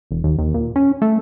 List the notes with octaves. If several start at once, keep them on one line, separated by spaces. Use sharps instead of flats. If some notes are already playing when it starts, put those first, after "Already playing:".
E1
D#2
D#2
A#2
C#4
A3